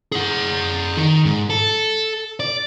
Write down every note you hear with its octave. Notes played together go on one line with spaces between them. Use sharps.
G#4 F#5
D#3
G#2
A4
D5